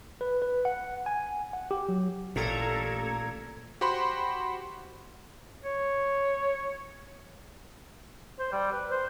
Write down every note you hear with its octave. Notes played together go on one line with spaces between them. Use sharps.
B4
B4
F#5
G#5
F#5
G4
F#3
A1 A#2 G4 A4 A#5 G#6
F#4 G4 C5 F#5 B5 C6
C#5
C5
G3
B4
C5